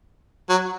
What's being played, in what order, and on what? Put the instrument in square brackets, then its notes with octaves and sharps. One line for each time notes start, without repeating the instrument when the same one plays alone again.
[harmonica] F#3